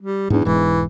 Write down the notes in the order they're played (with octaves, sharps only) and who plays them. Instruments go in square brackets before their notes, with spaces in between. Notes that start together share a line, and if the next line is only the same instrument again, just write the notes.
[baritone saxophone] G3
[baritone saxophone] E2 [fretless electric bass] G#2 D4
[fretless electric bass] E1 E2 G#2 [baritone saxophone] E3